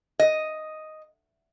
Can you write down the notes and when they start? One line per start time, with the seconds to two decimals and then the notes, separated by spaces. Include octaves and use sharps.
0.19 D#5